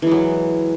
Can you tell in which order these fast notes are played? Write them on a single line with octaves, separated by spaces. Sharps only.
E3 G#3 F#3